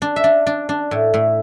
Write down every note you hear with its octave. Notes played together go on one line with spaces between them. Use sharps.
D4
E5
D4
D4
D4
A2
A2